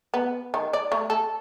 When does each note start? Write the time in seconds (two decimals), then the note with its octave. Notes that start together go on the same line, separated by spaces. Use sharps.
0.14 B3
0.54 D#3
0.73 D5
0.92 A3
1.10 A4